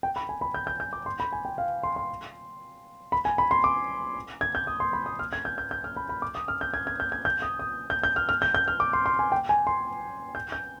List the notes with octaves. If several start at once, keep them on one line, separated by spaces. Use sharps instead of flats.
G5
B5
G#5
B5
G6
G6
G6
D6
C6
B5
G#5
G5
F5
C6
C6
B5
G#5
B5
C6
D6
G#6
G6
D#6
C6
B5
D#6
F6
G#6
G6
G6
G6
F6
B5
B5
D6
D#6
F6
G6
G#6
G#6
G6
G#6
G6
D#6
D#6
G6
G6
F6
F6
G6
G6
F6
D6
C6
C6
G#5
G5
G#5
C6
G6
G6